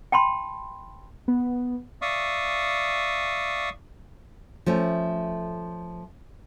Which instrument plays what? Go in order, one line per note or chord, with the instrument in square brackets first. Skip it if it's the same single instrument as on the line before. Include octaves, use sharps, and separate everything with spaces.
[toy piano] G5 A5 B5 C6
[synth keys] B3
[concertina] D5 E5 F5 C#6 D#6
[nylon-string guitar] F3 A3 C#4